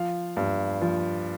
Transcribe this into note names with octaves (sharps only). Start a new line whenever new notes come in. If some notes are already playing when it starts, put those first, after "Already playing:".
Already playing: F3 F5
G2
F3